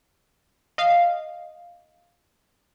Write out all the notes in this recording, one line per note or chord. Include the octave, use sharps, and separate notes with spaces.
D#5 F5